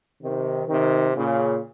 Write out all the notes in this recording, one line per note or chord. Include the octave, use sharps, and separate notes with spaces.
C3 D#3
C3 D#3
A#2 C#3